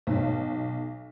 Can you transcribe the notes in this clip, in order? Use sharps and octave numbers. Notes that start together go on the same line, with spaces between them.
B1